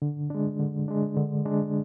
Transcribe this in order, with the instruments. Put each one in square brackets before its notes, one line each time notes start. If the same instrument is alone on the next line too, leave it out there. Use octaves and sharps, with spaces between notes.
[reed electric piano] D3
G#3 D4
D3
G#3 D4
D3
G#3 D4